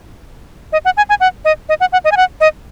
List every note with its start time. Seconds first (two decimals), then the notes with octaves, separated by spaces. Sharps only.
0.73 D#5
0.85 F#5
0.97 G#5
1.09 G#5
1.20 F#5
1.45 D#5
1.69 D#5
1.80 F#5
1.93 F#5
2.04 D#5
2.12 G#5
2.17 F#5
2.41 D#5